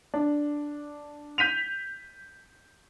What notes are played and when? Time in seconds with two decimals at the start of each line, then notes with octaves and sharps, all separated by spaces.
0.14 D4
1.38 G6 B6 D#7 F7